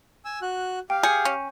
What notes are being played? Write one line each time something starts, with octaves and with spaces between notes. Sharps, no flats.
G#5 E6
F#4 F#6
G4 F5 G5
G#4 G6 C#7
C#4